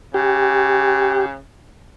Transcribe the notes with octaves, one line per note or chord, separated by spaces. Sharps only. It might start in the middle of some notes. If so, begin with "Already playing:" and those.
C#3 G4